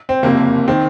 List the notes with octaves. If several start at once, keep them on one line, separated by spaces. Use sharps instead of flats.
C4
F#1 F2 C3 A#3
D#3 C4